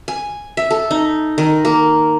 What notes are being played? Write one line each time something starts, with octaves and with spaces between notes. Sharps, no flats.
G#5
E5
A4
D#4
D#3
A#3